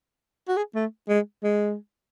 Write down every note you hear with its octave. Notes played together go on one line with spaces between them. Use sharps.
F#4
G#4
A3
G#3
G#3